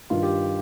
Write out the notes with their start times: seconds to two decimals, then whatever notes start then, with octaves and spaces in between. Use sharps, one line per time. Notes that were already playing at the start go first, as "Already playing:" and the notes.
0.10 G2 D#3 G3 F4
0.23 G4